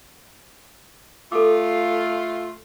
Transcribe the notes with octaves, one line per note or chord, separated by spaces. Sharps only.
A3 F4 A4 D6